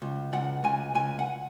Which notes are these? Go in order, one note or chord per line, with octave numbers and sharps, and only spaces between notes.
C#2
C#2 F#5
C#2 G#5
C#2 G#5
F#5